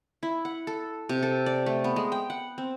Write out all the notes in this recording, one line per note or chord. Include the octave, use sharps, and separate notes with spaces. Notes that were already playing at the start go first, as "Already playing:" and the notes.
E4
F#5
A4
C3
A4
D5
A3
B3
G#3
G5
F#5
C4